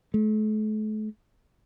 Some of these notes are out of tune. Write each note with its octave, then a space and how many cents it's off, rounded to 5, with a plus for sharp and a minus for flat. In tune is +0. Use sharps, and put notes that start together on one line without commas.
A3 -40